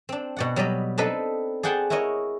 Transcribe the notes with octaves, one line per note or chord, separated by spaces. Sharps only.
C4 D4
B2 D5 F#5
F#3 G3 B4 D5 D#5
C4 D4 D#4 A4 B4 D#5
G#4 D5 F#5 G5 A5 C6
E4 F#4 A#4 C#5 D#5